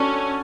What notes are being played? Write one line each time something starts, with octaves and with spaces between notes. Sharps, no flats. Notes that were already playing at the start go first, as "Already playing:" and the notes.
Already playing: C#4 D4 F#4 A4 D5